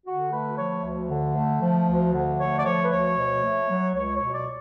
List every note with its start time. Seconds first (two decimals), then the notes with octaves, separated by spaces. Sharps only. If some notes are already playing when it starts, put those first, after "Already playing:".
0.07 D3 F#4
0.33 A3 B4
0.58 F3 C#5
0.85 D2
1.10 D3
1.36 A3
1.62 F3
1.89 D2
2.14 D3
2.40 A3 C#5
2.59 D5
2.66 F3 C#5
2.83 B4
2.92 D2 C#5
3.18 B2
3.44 A3
3.70 F#3
3.95 C#2 C#5
4.16 C#5
4.21 B2
4.34 D5